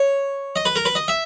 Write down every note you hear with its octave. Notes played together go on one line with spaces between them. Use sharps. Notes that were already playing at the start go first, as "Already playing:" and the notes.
Already playing: C#5
D#5
B4
A#4
B4
D#5
E5